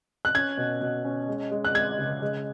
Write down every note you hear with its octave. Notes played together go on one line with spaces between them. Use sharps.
F#6
C#4 G#6
B2
B2
C#4
G#3
G#3
F#6
G#3 G#6
C#3
G#3